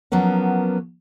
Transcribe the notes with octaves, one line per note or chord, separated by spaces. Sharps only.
F3 F#3 A#3 B3 C#4